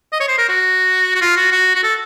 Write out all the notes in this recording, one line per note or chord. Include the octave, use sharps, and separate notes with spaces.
D#5
C#5
C5
A#4
F#4
F#4
F4
F#4
F#4
F#4
A4